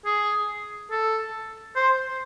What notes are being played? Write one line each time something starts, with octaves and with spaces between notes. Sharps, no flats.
G#4
A4
C5